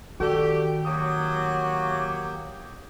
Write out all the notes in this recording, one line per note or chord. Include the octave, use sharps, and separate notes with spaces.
D#3 F#4 G4 A4 D5
F#3 A#3 G4 D#6